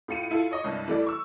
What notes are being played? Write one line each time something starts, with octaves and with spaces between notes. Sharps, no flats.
A2 F4 C#7 D#7
E4 F4 A4
C#5 D#5 C#6
C2 G2
E3 A3 D5
C#6 E6